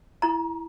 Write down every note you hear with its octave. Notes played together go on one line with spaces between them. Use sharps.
E4 A#5